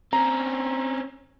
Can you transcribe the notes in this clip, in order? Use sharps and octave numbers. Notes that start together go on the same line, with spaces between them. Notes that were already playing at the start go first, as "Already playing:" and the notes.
C4 C#4 A#5